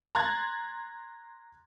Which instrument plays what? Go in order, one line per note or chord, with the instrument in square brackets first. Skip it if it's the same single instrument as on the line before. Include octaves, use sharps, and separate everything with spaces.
[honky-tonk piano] A#5 C6 F#6 G#6 A6